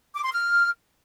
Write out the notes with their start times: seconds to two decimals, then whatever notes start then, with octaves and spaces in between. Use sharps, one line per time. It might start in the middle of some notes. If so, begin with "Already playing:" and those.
0.16 D6
0.24 C6
0.32 F6